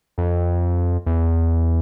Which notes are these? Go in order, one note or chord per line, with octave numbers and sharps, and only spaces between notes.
F2
E2